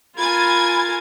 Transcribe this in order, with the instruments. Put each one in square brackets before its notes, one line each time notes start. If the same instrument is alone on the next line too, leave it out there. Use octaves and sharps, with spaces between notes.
[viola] F4 A#4 [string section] G#5 G#6 A6 [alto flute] B5